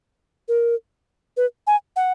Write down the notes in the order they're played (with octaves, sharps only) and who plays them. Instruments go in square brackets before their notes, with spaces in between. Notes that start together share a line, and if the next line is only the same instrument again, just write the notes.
[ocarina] A#4
B4
G#5
F#5